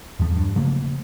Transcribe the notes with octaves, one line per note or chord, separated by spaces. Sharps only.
E2 F3
G2
C#3 F3 A3 A#3